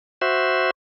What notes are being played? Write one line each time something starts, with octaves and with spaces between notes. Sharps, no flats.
F#4 C5 E5